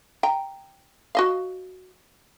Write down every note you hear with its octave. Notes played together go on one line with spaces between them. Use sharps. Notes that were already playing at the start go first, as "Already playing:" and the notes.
G5 A#5
F#4 D#5 F5